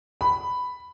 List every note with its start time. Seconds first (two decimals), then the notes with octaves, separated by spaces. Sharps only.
0.21 B5